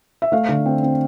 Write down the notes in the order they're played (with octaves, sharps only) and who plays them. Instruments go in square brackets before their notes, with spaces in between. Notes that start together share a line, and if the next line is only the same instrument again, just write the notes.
[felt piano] E5
A3 F5
D3
C4
C4